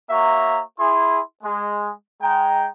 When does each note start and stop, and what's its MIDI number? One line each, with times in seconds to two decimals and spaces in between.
0.11 0.62 58
0.11 0.62 66
0.11 0.62 73
0.11 0.62 76
0.11 0.62 82
0.11 0.62 85
0.80 1.21 64
0.80 1.21 68
0.80 1.21 84
1.44 1.92 56
2.22 2.69 56
2.22 2.69 79
2.22 2.69 82